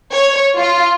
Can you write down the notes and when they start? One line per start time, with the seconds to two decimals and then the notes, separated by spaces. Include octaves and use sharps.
0.12 C#5
0.57 F4